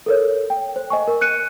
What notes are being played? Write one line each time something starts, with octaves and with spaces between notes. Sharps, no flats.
A4 A#4 C#5
G5
C5
D#5 G#5 C#6
A#4
F#6 C#7 D#7